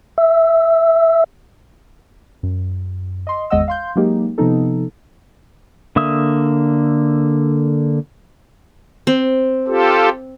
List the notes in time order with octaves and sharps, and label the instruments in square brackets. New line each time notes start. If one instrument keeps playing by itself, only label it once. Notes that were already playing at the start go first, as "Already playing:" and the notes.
[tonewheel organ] E5
[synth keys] F#2
D#5 C6
G#1 E2 G#3 D#5 F#5 E6
F5 C6 G6
F#3 G#3 A#3 D#4 G4
C3 F3 B3 D#4 A4
[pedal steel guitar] D3 A#3 E5 D#6
[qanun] C4
[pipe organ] F4 G4 A4